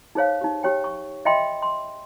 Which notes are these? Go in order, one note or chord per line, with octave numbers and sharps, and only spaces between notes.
D#4 G#4 C5 C#5 F5
D#4 G4
G4 C#5 G5
C#6
D#5 E5 G5 B5 C6
C6